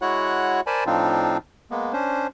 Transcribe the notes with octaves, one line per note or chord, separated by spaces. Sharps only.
G#3 E4 F#4 C#5 F#5 F#6
A#4 C5 D5 G#5 A5 B5
A2 F3 C4 D4 D#4 F4
G#3 A#3 B3
C#4 D4 C5